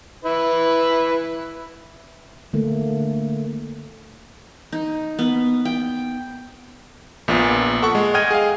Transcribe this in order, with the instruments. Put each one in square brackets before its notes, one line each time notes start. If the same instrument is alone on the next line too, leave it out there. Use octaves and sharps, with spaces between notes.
[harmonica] E4 B4
[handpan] D3 A3 A#3
[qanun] D#4
B3
G5
[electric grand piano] A#1 A#2 B3
A4 F#5 C#6
G#3
D#5 F#5 G5 F6 G#6 D#7
G#4 F5